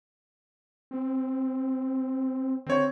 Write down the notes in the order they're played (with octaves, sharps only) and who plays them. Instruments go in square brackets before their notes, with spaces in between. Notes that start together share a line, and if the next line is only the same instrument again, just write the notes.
[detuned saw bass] C4
[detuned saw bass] D3 [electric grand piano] C4 C#5